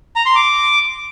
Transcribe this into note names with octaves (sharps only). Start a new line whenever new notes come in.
A#5
C6
D6